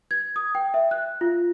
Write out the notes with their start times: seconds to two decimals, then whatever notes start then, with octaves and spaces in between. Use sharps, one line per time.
0.11 G#6
0.36 D#6
0.55 G5
0.74 E5
0.91 F#6
1.21 F4